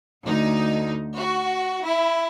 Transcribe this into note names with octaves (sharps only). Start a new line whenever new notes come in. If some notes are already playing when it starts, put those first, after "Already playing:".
D2 D#4
F#4
E4